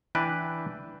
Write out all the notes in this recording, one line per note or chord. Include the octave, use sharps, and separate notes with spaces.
E3 D4 B4 G5